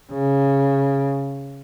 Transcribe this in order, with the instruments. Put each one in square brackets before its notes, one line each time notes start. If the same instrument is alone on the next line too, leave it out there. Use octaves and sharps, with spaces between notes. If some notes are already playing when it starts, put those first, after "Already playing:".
[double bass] C#3